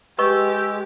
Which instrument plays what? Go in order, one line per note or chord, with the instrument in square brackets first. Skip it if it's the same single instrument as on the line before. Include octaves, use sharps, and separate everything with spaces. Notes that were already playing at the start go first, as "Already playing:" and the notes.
[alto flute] G#3 [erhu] G4 [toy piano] B4 D#5 C#6 [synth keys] E6